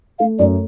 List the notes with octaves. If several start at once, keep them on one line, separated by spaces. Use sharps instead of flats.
A3 F5
F#2 D5